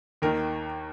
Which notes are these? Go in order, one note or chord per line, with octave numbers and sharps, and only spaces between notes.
D#2 D#3 A#4